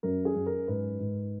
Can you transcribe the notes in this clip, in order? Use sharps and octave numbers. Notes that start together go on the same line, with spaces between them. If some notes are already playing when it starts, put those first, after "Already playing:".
F#2 A#4
G#4
F#2
A#4
G#2 B4
G#2